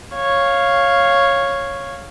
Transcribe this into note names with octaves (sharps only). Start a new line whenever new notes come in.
C#5 F5